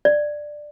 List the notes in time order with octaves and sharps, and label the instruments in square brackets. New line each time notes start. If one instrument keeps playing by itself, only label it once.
[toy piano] D5